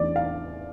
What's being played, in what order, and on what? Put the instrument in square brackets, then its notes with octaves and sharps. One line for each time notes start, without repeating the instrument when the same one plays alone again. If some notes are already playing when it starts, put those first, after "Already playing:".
Already playing: [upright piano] E2 E3 A3 C#4 D5
F5